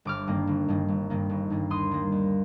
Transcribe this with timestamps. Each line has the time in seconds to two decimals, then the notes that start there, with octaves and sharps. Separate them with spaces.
0.05 G1 D6 F6
0.27 G2 D#3 A#3
0.47 G1
0.68 G2 D#3 A#3
0.88 G1
1.10 G2 D#3 A#3
1.29 G1
1.50 G2 D#3 A#3
1.70 D#2 C6 D#6
1.91 D#3 G3 A#3
2.12 D#2